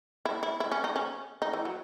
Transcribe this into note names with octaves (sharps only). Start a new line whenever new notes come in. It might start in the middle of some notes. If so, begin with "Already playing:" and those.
E4
E4
E4
C#4
D#4
C#4
D#4
E3
F#3